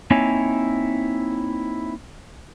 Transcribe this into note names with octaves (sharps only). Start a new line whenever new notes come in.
A#3 C4 D#4 E4 C#5 G#5